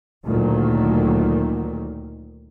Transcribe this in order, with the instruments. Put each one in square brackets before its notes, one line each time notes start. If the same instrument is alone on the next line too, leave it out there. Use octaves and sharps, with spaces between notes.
[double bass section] D2 A#2 D#3 F#3